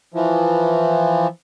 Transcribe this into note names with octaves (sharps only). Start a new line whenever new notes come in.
E3 F3